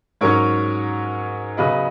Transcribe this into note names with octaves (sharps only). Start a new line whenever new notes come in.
G#2 F#3 C#4 A#4 C#5
C#3 F#3 B3 B4 D#5